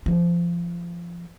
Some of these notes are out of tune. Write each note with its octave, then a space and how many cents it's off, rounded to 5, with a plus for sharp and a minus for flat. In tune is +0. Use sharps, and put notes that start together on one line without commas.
F3 -20